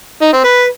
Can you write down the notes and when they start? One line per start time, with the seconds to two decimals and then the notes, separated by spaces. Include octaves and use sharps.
0.22 D#4
0.33 C4
0.44 B4